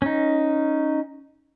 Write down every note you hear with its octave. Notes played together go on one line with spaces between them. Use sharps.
C#4 D#4